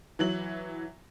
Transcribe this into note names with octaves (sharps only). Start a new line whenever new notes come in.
E3 F#3 F#7